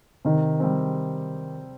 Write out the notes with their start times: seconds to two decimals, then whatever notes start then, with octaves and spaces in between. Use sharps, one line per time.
0.25 C3 D#3
0.60 G3 C4